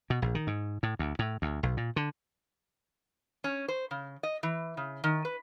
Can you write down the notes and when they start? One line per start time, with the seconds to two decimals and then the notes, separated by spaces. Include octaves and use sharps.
0.10 B2
0.22 A#1
0.35 D#3
0.47 G#2
0.83 A2
0.99 D2
1.19 A2
1.42 D2
1.63 B1
1.77 A#2
1.96 D3
3.44 C#4
3.68 C5
3.91 C#3
4.23 D#5
4.43 E3
4.77 C#3
5.04 D#3
5.25 B4